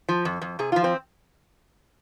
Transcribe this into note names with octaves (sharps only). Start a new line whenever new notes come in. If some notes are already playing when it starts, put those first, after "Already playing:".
F3
F2
F2
C3 G#4
F3 F4
C4